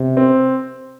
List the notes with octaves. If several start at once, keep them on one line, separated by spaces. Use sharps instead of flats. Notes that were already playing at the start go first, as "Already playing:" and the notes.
Already playing: C3
C4